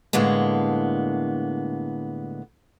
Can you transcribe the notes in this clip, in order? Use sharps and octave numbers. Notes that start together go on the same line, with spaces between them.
A2 D3 G#3 A#3 B3